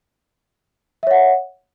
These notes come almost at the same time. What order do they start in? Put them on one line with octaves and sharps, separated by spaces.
E5 C#5 F#5